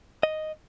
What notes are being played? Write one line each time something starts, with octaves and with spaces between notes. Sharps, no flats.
D#5